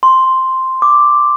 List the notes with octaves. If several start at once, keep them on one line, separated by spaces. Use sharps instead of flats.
C6
D6